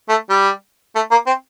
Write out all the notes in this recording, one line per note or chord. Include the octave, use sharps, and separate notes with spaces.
A3
G3
A3
A#3
C4